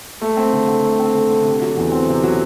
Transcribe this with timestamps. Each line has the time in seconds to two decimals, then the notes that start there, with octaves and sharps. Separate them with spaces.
0.22 A3
0.37 C4
0.53 D3
0.68 D3
0.83 A3
1.00 C4
1.14 D3
1.30 D3
1.45 C3
1.62 F#3
1.77 E2
1.92 C4
2.08 C3
2.24 F#3